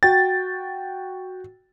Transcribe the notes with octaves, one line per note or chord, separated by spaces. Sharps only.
F#4 G5 A6